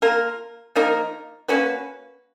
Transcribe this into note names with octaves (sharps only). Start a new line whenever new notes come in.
A#3 F4 A#4
F3 A#3 D#4 A#4
A#3 C#4 F#4 B4